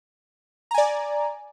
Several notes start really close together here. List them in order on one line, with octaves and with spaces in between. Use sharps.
A#5 G#5 D5